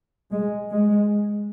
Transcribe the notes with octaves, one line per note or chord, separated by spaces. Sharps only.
G#3
G#3